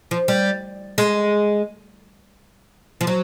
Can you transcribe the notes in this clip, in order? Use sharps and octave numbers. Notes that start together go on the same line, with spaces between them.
F3
G3
G#3
F3
F#3